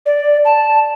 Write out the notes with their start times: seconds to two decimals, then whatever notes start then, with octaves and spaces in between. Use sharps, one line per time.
0.06 D5
0.45 A5